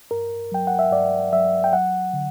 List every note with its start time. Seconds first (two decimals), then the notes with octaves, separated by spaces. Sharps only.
0.11 G2 A#4
0.52 F#3 G5
0.67 F#5
0.79 E5
0.91 G2 D5
1.32 F#3 E5
1.64 G5
1.73 F#3 F#5
2.13 D3